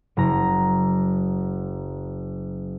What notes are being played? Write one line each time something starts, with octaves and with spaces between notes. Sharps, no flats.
F#1 A#5